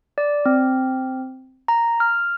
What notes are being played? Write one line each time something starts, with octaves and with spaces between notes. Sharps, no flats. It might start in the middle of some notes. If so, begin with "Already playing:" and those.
D5
C4
A#5
F6